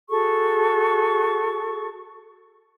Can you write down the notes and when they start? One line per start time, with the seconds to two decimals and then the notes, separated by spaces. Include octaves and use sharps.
0.09 F#4 G#4 A4 C#6